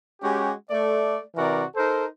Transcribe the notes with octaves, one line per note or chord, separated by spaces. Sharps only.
G#3 C#4 F#4 G4
A3 D5
C3 E3 F#4 A#4 D5
D#4 A4 A#4 C5